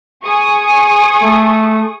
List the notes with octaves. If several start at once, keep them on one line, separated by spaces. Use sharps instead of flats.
G#4 C#6 D#6
A3